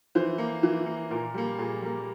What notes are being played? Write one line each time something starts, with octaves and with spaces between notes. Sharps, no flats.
E3 C5
A#3
E3
A#3
A#2 A#4
G3 A#3
A#2 G#4
G3 A#3